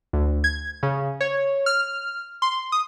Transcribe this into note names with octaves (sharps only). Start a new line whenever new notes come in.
D2
G#6
C#3
C#5
F6
C6
D#6